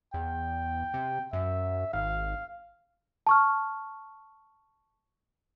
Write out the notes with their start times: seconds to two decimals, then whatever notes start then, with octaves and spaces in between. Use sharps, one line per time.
0.14 E2 G5
0.94 C3
1.33 F#2 E5
1.93 G#1 F5
3.27 A5 C#6 F6